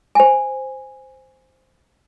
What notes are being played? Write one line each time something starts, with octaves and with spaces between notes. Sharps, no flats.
C5 G#5